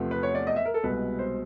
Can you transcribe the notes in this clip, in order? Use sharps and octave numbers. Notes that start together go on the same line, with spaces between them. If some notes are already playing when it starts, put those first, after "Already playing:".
Already playing: E2 C3 F3 A3
B4
C#5
D5
D#5
E5
A#4
A4
C2 B2 G#3 B4
C5